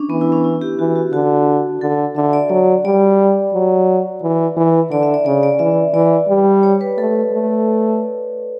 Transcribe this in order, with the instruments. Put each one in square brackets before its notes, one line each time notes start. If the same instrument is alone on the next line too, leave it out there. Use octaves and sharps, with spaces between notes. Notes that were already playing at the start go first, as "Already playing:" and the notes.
Already playing: [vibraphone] C#4 D4
[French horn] E3 [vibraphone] B3
[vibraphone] E4
C#4
E4
G4
[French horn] E3 [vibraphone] F#4
[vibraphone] F#4
[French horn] D3 [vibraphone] F#4
[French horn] D3 [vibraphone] A4
[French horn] D3 [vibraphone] E5
[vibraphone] D5
[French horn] F#3 [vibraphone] D5
[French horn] G3 [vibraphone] D5
[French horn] F#3
E3
E3
[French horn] D3 [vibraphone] D5
[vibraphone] E5
D5
[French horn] C#3 [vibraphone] D5
[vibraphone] D5
[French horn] E3 [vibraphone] E5
[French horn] E3 [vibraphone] D5
[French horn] G3
[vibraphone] C#5
B4
[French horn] A3 [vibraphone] A4
[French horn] A3